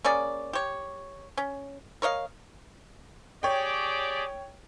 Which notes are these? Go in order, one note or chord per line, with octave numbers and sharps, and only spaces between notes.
A#3 C#4 G#4 D5
G4 C#5
C#4
A#4 C#5 D#5 F5
G4 G#4 C#5 D5 G5